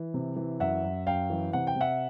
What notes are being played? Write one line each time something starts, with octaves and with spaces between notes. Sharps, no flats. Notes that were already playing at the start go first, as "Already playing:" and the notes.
Already playing: E3
C3
E3
F#2 E5 F#5
F#2
F#2 F5 G5
E3
C3 F#5
G5
C3 E5 F#5